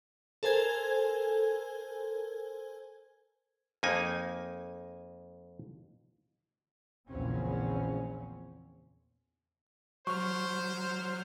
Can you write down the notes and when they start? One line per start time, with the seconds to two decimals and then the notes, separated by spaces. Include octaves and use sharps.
0.43 A4 A#4 C5 G#5 G#6
3.83 F2 A#3 D#4 G#5
7.08 A#1 E2 A#2 C#3 C4 C#4
10.07 F#3 C5 C#6 F6